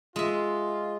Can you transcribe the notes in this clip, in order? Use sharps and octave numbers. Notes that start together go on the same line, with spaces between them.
G#3 F4 E5